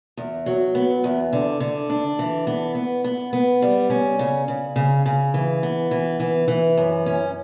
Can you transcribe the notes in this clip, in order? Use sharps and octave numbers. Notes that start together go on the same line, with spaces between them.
E2
F#3
B3
E2
D3
D3
D4
E3
B3
B3
B3
B3
G3
C#4
C#3
C#3
C#3
C#3
E3
B3
E3
E3
E3
F#2
C#4